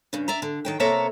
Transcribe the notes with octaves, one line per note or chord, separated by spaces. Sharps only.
G2 C#3
D5 E5 A#5
D3
D#3 F#3 G5
C3 A#3 A4 C#5 E5 A#5